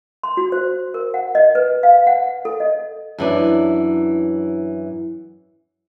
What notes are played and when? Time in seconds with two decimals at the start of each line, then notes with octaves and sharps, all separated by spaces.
0.23 C6
0.37 F#4
0.52 C5
0.94 A#4
1.14 F#5
1.35 D#5
1.55 B4
1.83 F5
2.07 F#5
2.45 A4
2.60 D#5
3.18 F#2 E3 D4